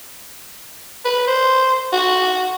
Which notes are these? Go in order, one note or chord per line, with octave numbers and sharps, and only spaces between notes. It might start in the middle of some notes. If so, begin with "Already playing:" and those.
B4
C5
F#4